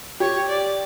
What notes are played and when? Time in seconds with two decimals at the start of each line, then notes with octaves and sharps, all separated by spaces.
0.20 G4 C#5
0.49 D5